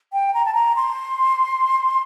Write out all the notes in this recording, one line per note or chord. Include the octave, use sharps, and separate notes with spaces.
G5
A#5
A5
A#5
C6